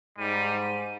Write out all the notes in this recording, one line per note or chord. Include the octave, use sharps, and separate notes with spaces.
G#2 G3 D#7